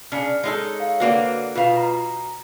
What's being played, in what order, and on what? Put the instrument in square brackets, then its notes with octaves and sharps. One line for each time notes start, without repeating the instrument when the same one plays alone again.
[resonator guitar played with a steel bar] C#3 D4 [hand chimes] F6 C#7
[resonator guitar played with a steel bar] G#3 D#4 A4 [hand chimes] C#5 E6
[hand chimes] C#5 F5
[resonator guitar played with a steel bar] D3 A#3 F#4 [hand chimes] B4 D5
[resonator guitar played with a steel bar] B2 F5 [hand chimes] F4 B4
[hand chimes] A#5